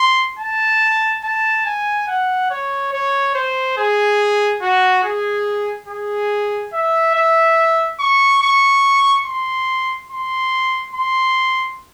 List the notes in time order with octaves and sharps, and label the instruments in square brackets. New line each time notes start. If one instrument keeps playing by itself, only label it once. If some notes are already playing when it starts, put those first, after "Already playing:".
Already playing: [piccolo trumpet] C6
A5
A5
G#5
F#5
C#5
C#5
C5
G#4
F#4
G#4
G#4
E5
E5
C#6
C#6
C6
C6
C6